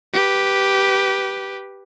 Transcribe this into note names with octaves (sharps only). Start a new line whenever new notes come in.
G4 B4